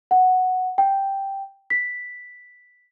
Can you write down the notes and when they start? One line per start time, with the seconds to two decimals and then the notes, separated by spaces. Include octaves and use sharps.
0.11 F#5
0.78 G5
1.70 B6